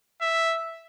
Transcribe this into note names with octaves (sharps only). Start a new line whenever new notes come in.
E5